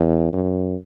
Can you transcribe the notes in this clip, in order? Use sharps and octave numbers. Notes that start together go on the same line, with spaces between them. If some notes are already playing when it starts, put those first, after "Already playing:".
Already playing: E2
F#2